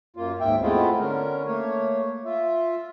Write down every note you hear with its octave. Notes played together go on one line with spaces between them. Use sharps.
F#2 A#3 F4
D#2 G#2 E5 G5
G#3 A3 B3 C4 E4 F4
D3 C#4 A#4
A3 A#3 C#5
F4 E5